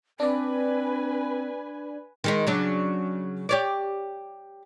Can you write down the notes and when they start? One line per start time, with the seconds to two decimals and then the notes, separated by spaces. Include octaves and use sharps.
0.20 C4 D4 B4 D5 G#5
2.24 D#3 G#3 D#4
2.47 C#3 F#3 D4
3.49 G4 C#5 D5